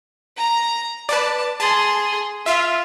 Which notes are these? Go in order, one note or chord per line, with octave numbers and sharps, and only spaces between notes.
A#5
B4 D5 A5
G#4 A5 C6
F4 E5 F5